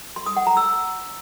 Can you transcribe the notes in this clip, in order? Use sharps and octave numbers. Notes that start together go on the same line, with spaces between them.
C6
D#6
F#5
A#5
E6